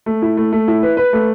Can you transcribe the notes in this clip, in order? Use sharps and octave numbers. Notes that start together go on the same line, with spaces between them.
A3
E4
A3
A3
E4
B4
B4
A3